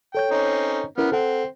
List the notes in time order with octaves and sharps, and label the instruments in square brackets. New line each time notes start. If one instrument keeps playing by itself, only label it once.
[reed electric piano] A4 C#5 G6 [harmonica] G5
[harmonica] C4 C#4 D#4
[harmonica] B3 F6 [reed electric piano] C#4 E4 A#4
[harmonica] C4 [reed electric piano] A4 F#5